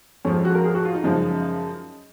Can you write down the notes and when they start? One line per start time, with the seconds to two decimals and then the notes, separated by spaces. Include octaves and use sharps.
0.25 F2 F3 G#3 C#4
0.45 F#4
0.55 A#4
0.64 G#4
0.75 F#4
0.85 F4
0.94 D#4
1.04 F#2 C#3 F3 G#3